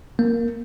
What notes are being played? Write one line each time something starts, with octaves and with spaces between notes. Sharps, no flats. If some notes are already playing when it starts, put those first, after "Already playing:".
A#3